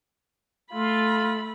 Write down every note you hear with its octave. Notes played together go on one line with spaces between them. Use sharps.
A3 F4 B5